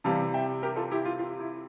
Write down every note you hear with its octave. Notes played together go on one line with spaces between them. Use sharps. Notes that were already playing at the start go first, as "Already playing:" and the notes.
C3 E3 G3 F5 A5
E5 G5
G4 A#4
F4 A4
E4 G4
F4
F4
E4